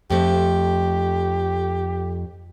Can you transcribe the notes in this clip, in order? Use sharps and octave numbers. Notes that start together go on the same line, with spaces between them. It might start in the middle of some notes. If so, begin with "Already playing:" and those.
F2 A3 G4